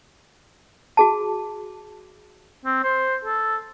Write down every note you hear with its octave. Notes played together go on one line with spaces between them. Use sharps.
F#4 G#4 A5
C4
C5
A4